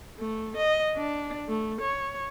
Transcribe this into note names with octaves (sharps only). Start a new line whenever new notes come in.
A3
D#5
D4
A3
C#5